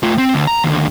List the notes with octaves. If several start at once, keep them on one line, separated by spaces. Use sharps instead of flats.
A3 F4
C4
D2
A#5
D#2 D3